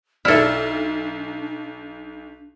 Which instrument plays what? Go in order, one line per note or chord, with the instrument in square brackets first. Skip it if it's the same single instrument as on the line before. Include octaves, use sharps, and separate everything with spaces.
[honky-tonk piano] B1 F6 [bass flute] D4 [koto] E4 A4 [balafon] D5 E5 A5